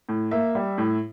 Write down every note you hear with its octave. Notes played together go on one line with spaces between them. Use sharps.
A2
A#3 E5
G3
A2